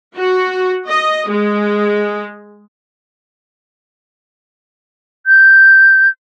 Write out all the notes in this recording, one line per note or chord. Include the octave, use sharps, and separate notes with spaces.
F#4
D#5
G#3
G6